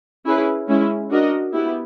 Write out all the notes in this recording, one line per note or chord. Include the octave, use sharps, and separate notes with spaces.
C#4 E4 G#4 B4
G#3 C#4 E4
D4 F#4 A#4 D#5
B3 E4 G4